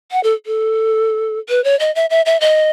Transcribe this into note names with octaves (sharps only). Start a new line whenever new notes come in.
F#5
A4
A4
B4
C#5
D#5
E5
E5
E5
D#5